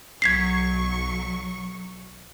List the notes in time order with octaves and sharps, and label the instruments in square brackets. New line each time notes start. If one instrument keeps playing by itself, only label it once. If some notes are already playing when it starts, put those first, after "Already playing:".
[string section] B1 F#3 C#6 [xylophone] G#6 B6 C7